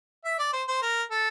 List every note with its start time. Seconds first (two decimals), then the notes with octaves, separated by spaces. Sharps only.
0.25 E5
0.39 D5
0.53 C5
0.68 C5
0.82 A#4
1.11 A4